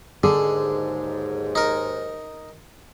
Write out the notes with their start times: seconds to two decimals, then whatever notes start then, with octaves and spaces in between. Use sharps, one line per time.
0.23 D#2 G#2 D3 G#4
1.55 D#4 A#4